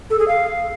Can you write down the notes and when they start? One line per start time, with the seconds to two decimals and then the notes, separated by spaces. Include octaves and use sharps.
0.10 A4
0.19 G#4
0.27 F5